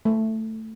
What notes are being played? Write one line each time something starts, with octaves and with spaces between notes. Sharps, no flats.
A3